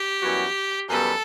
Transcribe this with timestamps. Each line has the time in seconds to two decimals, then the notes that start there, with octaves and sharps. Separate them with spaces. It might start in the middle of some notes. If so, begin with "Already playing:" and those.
Already playing: G4
0.21 F#2 E3 G3 B3 F#4
0.89 F#2 E3 G3 B3 F#4 A4